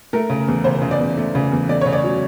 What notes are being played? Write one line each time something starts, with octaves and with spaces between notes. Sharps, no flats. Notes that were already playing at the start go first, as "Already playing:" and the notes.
A3 A#4
C#3
E2
C#3 C5
C#3
D5
E2
A3
C#3
E2
A3 D5
C#3 C#5
D5
F#3